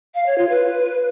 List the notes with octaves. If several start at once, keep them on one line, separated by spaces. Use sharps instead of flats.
F5
C#5
F4
B4